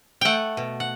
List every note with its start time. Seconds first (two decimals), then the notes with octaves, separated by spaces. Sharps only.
0.21 A3 F#5 G5
0.57 B2
0.80 F#5